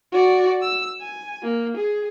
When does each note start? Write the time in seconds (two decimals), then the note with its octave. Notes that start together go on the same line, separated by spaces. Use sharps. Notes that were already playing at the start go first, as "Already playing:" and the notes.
0.12 F#4 D5
0.62 E6
1.01 G#5
1.43 A#3
1.77 G#4